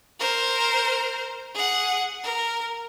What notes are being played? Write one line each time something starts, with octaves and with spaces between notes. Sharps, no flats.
A#4 C5
G#4 F#5
A#4